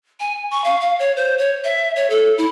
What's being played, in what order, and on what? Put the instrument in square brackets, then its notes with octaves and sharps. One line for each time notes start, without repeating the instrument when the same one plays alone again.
[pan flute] G#5
C#6
F5
F5
C#5
C5
C#5
E5
C#5
A4
E4